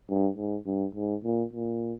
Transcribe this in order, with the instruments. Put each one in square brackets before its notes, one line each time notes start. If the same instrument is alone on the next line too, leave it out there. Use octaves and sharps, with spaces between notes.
[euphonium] G2
G#2
G2
G#2
A#2
A#2